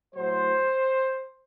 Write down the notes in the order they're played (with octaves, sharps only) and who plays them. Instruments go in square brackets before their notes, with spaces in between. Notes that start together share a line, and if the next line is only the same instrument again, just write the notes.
[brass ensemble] A2 F#3 C5